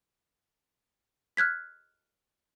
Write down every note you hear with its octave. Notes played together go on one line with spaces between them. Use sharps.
F6 F#6 G#6 B6